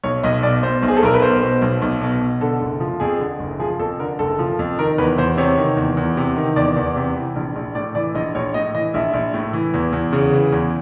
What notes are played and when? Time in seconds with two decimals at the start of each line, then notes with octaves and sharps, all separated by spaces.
0.04 B1 C#5
0.23 B1 D#5
0.43 B2 D5
0.63 B2 C5
0.83 B1
0.88 G#4
0.97 A4
1.03 B1 A#4
1.14 B4
1.22 B2 C5
1.42 B2
1.62 B1
1.82 B1
2.01 B2
2.21 B2
2.41 D3 A4
2.61 F#1
2.80 F3
3.00 F2 G#4
3.20 D3
3.39 F#1
3.60 F3 G#4
3.80 F2 A4
4.00 D3 A#4
4.19 F#1 A4
4.39 F3
4.59 F2
4.78 D#3 A#4
4.98 E2 B4
5.18 E2 C5
5.37 C3 C#5
5.58 D#3
5.77 E2
5.97 E2
6.17 C3
6.36 D#3
6.56 E2 D5
6.77 E2
6.96 C3
7.16 E3
7.36 A#1
7.56 A#1
7.75 A2 D5
7.95 E3 D5
8.15 A#1 D#5
8.35 A#1 C#5
8.54 A2 D#5
8.74 E3 D#5
8.94 A#1 E5
9.14 A#1
9.34 A2
9.53 E3
9.74 E2
9.93 E2
10.13 C#3
10.32 E3
10.52 E2